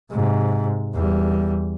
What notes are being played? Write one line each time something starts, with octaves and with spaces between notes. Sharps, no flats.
G#2 C3
E2 G3